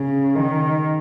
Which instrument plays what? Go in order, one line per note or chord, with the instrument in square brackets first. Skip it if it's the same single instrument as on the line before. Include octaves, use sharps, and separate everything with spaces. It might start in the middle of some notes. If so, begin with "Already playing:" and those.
Already playing: [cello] C#3
D#3